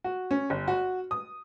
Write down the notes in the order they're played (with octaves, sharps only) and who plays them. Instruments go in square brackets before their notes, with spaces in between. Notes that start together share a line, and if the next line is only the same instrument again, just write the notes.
[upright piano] F#4
C#4
G1
F#4
D#6